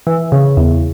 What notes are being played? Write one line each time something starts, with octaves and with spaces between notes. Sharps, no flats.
E3
C#3
E2